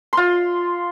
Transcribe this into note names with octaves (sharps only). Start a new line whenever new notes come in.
F4 C6